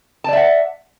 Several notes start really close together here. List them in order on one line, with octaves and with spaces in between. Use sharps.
A5 D5 E5 F#5